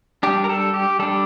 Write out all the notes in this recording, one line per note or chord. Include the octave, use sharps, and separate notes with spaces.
G3 D4 G4
A#4
A4
G4
G3 D4 A4